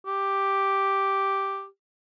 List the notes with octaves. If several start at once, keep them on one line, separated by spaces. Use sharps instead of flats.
G4